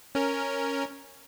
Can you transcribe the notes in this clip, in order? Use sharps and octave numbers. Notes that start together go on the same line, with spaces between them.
C#4 A#4